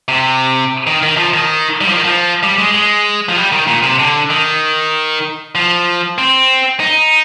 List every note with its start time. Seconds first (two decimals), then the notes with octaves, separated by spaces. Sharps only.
0.08 C3
0.87 D#3
1.03 D#3
1.17 F3
1.34 D#3
1.81 G3
1.89 F3
1.96 D#3
2.04 F3
2.43 G3
2.58 G#3
2.74 G#3
3.29 F3
3.37 G3
3.52 D#3
3.67 A#2
3.83 C3
4.00 D3
4.30 D#3
5.55 F3
6.18 C4
6.80 D#4